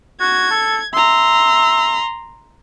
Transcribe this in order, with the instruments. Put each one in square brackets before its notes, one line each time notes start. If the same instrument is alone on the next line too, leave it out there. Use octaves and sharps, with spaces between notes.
[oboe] F#4 [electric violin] G#6
[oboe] A4
[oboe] E5 [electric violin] A#5 C6